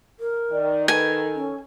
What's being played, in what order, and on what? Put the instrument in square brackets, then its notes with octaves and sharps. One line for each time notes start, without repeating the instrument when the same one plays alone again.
[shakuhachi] A#4
[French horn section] D#3 [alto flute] D5
[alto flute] A4 [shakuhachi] B4 [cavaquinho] G#5
[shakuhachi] C#4